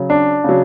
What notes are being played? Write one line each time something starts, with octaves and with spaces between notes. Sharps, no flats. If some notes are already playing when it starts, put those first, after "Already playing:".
Already playing: C#3 F#3
D4
C#3 F#3